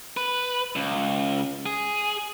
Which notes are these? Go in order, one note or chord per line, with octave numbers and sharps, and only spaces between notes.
B4
C#2
G#4